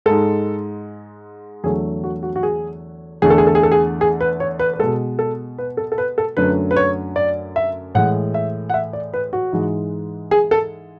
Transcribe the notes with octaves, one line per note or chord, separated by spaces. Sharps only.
G#2 G#3 A4
E2 D3 F#3 A3 G#4
F#4
F#4
F#4
G#4
E2 D3 A3 G#4
A4
G#4
A4
G#4
A4
G#4
G#4
B4
C#5
B4
B4
B2 G#3 A4
A4
B4
A4
A4
B4
A4
F#2 D3 F#3 A3 B4
B4
C#5
D5
E5
A2 E3 G#3 F#5
E5
F#5
E5
D5
B4
F#4
G#2 E3 G#3
G#4
A4